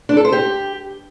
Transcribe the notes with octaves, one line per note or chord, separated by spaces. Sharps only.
D4
A4
C5
G4